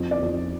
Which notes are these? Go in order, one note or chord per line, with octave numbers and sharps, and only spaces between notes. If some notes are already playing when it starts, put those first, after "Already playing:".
Already playing: F2
D5
F2